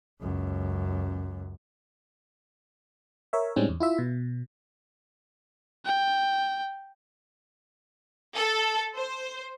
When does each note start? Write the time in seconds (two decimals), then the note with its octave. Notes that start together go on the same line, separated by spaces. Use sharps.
0.20 C#2 F#2
3.33 A#4 C#5 E5
3.56 A2 G3 G#3 C4 C#4 D#4
3.69 E2
3.80 E4 F4 E5
3.98 B2
5.85 G5
8.36 A4
8.95 C5